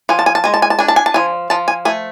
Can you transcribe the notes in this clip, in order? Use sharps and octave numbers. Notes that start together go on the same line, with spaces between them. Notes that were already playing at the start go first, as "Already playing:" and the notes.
F3 G#5
A5
G#5
A5
G#3 G#5
A5
G#5
A5
D4 G#5
A5
G#5
A5
F3 G#5
F3 A5
G#5
A3 G#5